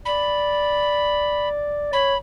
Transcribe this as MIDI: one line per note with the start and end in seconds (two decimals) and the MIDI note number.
0.05 1.90 74
0.05 1.49 83
1.93 2.15 73
1.93 2.17 83